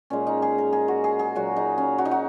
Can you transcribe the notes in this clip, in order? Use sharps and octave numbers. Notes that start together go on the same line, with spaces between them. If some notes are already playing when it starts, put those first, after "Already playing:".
A#2 G#3 C#4
D#4
G#4
A#4
G#4
F#4
G#4
G#4
A#2 F#3 F#4
D#4
C#4
F#4
D#4
F#4